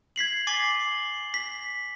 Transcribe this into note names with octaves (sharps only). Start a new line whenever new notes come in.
G#6 B6 C7 F#7
G#5 D6 A6 C7 F#7 G7
B6